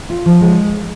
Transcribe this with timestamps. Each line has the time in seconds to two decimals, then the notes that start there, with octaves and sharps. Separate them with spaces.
0.10 F4
0.26 F3
0.41 G#3